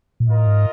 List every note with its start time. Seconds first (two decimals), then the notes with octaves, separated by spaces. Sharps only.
0.20 A#2
0.28 A2 F4 A#4 D#5
0.47 G#2